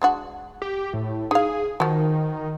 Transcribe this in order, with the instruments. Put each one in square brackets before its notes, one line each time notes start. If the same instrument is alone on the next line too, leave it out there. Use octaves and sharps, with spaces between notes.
[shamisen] G#3 D4 F#4
[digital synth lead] G4
A2
[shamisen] D#4 F5 [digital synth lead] G#4
[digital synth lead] D#3 [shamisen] F3 F#4